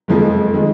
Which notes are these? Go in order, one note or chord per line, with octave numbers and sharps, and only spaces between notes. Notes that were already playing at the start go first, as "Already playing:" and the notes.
F#1 F2 F3 G#3
D#3 G#3